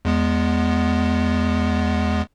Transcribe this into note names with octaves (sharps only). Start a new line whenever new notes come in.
E2 G#3 B3